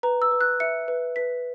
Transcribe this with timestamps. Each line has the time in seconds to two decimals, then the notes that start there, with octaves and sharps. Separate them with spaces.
0.03 B4 A#5
0.22 E6
0.31 B4
0.41 F#6
0.60 E5 C#7
0.88 B4
1.16 B4 B6